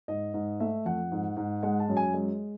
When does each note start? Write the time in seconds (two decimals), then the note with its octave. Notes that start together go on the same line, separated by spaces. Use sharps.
0.08 G#2 D#5
0.34 G#2
0.60 A3 E5
0.85 F2 F#5
1.12 G#2
1.37 G#2
1.63 G#3 F#5
1.80 A5
1.89 F#2
1.97 G#5
2.14 G#3